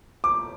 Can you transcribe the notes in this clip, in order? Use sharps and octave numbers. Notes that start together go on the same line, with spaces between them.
D6